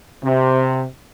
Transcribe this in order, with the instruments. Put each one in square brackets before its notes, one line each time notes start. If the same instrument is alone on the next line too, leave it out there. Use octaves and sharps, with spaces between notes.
[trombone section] C3